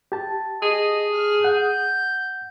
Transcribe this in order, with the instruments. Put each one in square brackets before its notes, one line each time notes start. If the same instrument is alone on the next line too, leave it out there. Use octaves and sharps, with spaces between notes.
[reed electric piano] G4 A5
[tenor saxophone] G#4 [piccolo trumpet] D#5
[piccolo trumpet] F6
[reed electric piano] F#5 [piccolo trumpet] G6